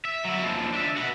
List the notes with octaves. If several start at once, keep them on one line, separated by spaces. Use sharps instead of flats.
E5
F#3 E4
D#2 F3
D4 E5
F#4 B4